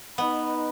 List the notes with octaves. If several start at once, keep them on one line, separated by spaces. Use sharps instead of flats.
B3 D#4 B4 D#5 B5